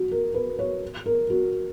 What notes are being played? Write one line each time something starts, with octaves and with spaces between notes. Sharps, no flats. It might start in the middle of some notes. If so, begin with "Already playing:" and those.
Already playing: F#4
A#4
B4
C#5
A#4
F#4